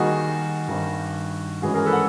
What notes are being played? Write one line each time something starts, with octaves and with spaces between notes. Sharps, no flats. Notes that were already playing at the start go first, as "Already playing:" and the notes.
Already playing: D#3 G3 A#3 D#4 F#4 G#4
G2 D#3 G3 C4
G#2 E3 G#3 C#4 F#4 G#4
G#4 A#4
A4 B4
F#5